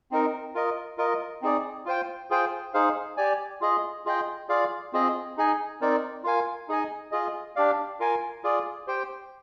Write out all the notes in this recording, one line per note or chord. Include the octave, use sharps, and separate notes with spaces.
C4 D#4 A#4
F4 A#4 D#5
F4 A#4 D#5
C4 D#4 G#4 D5
F4 C5 G5
F4 G#4 C5 G5
D#4 G#4 C5 F5
G4 D5 G#5
F4 G#4 D#5
F4 G#4 D#5 G5
F4 G#4 D5 F5
C4 F4 G#4 D#5
D#4 G#4 D#5 G#5
C4 D#4 A#4 D5
F4 A#4 F5 G#5
D#4 G#4 D#5 G#5
F4 G#4 D#5
D4 G4 D5 F5
F4 A#4 F5 G#5
F4 G#4 D5
G4 C5 G5